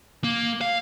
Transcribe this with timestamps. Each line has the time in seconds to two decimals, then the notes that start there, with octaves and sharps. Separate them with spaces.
0.24 A#3
0.61 F5